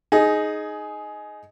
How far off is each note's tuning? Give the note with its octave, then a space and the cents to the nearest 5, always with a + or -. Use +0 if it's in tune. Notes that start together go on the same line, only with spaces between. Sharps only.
D#4 +0 G#4 +15